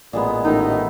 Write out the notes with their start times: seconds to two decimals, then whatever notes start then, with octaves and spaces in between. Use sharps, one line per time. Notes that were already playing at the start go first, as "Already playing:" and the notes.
0.13 A1 A#2 G#3 B3
0.44 A1 F2 D#3 D#4 E4